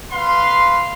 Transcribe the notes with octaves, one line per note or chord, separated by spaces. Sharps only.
B4 F5 C6